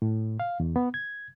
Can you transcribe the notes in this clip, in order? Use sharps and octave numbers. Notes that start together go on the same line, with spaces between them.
A2
F5
E2
B3
G#6